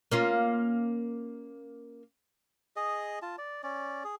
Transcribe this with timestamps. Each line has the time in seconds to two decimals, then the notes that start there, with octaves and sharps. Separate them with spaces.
0.12 A#3 C#4 F4
2.76 G#4 D#5
3.22 F4 A5
3.38 D5
3.63 C#4 D5
4.04 G#4